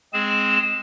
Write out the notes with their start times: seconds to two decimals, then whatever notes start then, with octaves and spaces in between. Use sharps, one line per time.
0.13 G#3 C4 G#4 E7